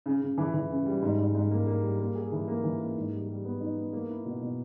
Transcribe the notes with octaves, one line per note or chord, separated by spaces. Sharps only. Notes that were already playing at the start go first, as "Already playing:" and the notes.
C#3
C#3
E3
E3
C#3
G3
G#2
G#2
G#2
A#3
A#3
G3
A#3
G#4
E3
A#3
E3
A#3
G#2
G3
G3
B3
D#4
B3
A#3
E4
B2
B2